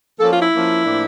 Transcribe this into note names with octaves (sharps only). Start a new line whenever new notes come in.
F3 A#3 C#4 A4
F4
E4
F3 A#3 C#4
A2 F3 A#3 D4